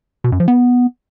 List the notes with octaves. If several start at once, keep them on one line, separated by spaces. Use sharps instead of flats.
B2
F#2
F3
B3